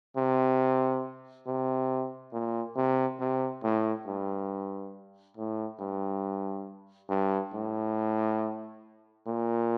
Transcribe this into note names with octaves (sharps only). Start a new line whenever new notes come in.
C3
C3
A#2
C3
C3
A2
G2
A2
G2
G2
A2
A#2